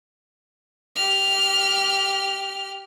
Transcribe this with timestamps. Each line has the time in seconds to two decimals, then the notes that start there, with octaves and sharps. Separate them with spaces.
0.96 G4 F6